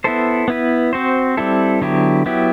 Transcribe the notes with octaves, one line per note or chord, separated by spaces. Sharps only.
B3 E4 A4 C5
B3 E4 B4
C4 F#4 C5
G3 C4 E4 A4
D3 F#3 B3 E4 G4
F#3 B3 E4 G4